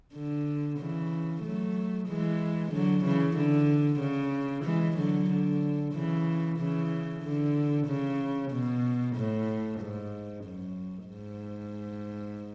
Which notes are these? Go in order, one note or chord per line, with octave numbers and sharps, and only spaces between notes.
D3
C#3 E3
F#3 A3
E3 G#3
D3 F#3
C#3 E3
D3
C#3
E3 G#3
D3 F#3
D3
C#3 E3
C#3 E3
D3
C#3
B2
A2
G#2
F#2
G#2